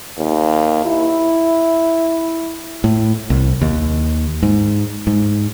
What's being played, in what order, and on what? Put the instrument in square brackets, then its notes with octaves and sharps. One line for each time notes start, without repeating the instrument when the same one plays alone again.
[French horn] D#2
E4
[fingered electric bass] A2
C2
D#2
G#2
G#2